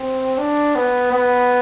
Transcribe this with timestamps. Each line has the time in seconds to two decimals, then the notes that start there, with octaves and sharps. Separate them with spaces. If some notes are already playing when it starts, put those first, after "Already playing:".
Already playing: C4
0.38 D4
0.76 B3
1.12 B3